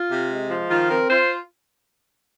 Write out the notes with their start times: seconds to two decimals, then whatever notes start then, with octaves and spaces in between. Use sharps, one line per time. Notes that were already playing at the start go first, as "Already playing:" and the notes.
Already playing: F4
0.10 C3
0.30 G#3
0.49 F3
0.69 D#3 F4
0.89 C4 A#4
1.10 F4 C5